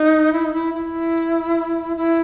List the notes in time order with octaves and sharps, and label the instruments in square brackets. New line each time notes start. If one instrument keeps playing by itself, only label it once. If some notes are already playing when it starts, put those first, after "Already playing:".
Already playing: [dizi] D#4
E4
D#4
E4
E4
E4